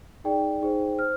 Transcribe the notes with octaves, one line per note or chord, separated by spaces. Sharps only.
D#4 G#4 D5 G5
D#4 G#4 C5
C5 F6